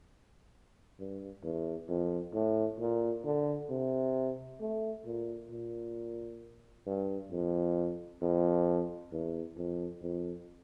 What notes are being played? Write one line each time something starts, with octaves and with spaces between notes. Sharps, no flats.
G2
E2
F2
A2
A#2
D3
C3
A3
A#2
A#2
G2
F2
F2
E2
F2
F2